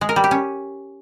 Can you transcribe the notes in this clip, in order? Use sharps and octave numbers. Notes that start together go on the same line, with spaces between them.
G#3
A#4
G3
G4
C#4